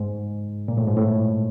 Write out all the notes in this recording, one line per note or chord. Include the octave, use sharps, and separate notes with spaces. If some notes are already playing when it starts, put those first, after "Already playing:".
Already playing: G#2
A#2
A2
G#2
A2